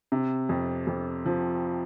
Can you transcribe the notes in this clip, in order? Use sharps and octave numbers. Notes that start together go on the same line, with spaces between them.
C3
F2
F2
F3